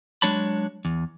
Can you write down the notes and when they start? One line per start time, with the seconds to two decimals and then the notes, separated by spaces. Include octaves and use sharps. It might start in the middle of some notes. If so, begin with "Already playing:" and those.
0.22 F#3 G#3 D4 C#5 A5 B5
0.85 E2